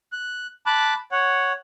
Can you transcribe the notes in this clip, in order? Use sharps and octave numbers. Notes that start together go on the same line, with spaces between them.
F#6
A5 B5 D6 F#6
C#5 F#5